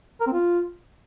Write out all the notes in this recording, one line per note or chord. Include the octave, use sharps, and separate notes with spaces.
A#4
C4
F4